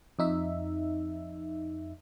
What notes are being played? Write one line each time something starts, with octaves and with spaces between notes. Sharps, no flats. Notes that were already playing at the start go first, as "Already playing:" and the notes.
F2 D#4 E5